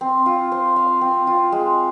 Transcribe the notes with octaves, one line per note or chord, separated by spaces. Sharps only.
C4
F4
C5
F5
C4
F4
G#3